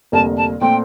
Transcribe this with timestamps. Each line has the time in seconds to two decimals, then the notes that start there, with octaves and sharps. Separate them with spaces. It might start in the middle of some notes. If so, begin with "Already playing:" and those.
0.12 F1 F2 D3 G3 A#3 A5
0.37 A5
0.61 A#2 A3 C4 G5